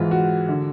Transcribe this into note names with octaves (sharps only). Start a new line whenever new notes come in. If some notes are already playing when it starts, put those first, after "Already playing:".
Already playing: G#2 E3 F4
F#4
D3